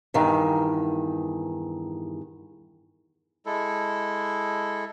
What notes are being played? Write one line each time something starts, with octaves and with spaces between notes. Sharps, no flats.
E2 G2 D#3
G#3 E4 A4